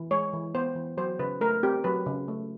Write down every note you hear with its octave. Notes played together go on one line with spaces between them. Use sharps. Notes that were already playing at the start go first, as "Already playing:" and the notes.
Already playing: E3
G#3 C#5
E3
B3 C5
E3
F#3 C5
C#3 B4
A3 A#4
C4 G4
F#3 B4
C#3
A3